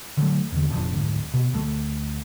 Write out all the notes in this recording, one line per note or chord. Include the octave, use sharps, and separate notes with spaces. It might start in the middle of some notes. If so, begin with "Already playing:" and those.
D3 F#3 G3 A3
E2 D3
F1 F2 A#2 D4
D2 G#2
B2
D2 A3